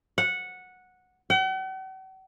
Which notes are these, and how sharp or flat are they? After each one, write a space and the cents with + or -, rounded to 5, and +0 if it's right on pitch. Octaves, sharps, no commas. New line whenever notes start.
F#5 -10
F#5 +45